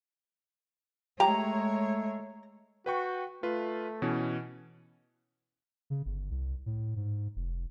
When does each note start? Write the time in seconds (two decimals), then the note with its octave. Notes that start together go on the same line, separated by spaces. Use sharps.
1.20 G#3 A3 G4 C#5 A#5
2.86 F#4 B4 G5 C#6
3.43 A3 F4 B4
4.02 B2 E3 C#4
5.90 C#3
6.05 G1
6.30 C2
6.66 A2
6.96 G#2
7.36 F1